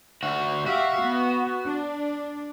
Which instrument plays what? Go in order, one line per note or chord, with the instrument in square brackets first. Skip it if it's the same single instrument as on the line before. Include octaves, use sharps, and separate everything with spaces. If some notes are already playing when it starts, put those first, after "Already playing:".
[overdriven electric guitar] D2 F#4
[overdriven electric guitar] F#4 [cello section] G4 E5 F5
[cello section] B3
D4